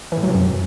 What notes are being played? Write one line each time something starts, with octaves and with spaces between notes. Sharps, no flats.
E3
A2
F#3
C3
F#2